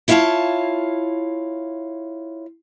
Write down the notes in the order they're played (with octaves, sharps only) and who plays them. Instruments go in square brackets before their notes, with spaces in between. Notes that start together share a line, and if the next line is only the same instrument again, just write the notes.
[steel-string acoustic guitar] B3 E4 F4 C#5 F5 A5